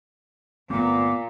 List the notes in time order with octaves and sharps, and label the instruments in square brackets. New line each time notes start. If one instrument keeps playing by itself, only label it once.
[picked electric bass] G1 A3 C4 [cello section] A#2 [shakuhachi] B3 [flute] D6